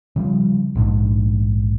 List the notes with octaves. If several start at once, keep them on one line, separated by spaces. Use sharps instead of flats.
C#3 F3 G3
A#1 G#2 B2 D4